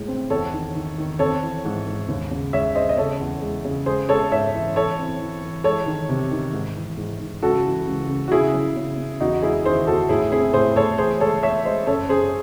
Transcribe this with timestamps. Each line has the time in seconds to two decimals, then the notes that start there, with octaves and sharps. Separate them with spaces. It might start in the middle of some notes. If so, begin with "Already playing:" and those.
Already playing: A2 G#3
0.08 C4
0.30 E2 A4 C#5
0.52 D#3
0.75 D#3
0.98 D#3
1.19 C4 A4 C#5
1.42 E3
1.65 G#2
1.87 G#2
2.08 D#2
2.31 C#3
2.53 G#3 C#5 E5
2.75 G#3 C5 D#5
2.89 D#5
2.97 C#3 A4 C#5
3.20 E2
3.42 G#3
3.65 C#3
3.86 G#3 G#4 C5
4.09 G#3 A4 C#5
4.31 G#2 C#5 E5
4.53 E3
4.75 E3 A4 C#5
4.98 C4
5.20 E3
5.43 E3
5.64 G#3 A4 C#5
5.86 D#3
6.09 C3
6.31 D#3
6.53 G#2
6.76 E3
6.97 G#2
7.20 G#2
7.43 C#2 F#4 A4
7.64 E3
7.87 C#2
8.09 C#2
8.28 F#4
8.31 C#3 E4 G#4
8.54 F#3
8.77 C#3
8.98 C#3
9.20 E2 D#4 F#4
9.42 G#3 E4 G#4
9.65 D#3 G#4 C5
9.87 E2 F#4 A4
10.09 A2 E4 G#4
10.32 C4 E4 G#4
10.53 A2 G#4 C5
10.76 A2 A4 C#5
10.98 E3 G#4 C5
11.20 G#3 A4 C#5
11.43 G#3 C#5 E5
11.65 G#3 C5 D#5
11.87 F#2 A4 C#5
12.09 F#2 G#4 C5